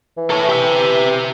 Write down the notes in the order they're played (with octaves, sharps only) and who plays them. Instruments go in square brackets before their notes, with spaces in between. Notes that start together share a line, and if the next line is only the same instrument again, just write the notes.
[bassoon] E3
[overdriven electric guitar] A4 C#5
G4 E5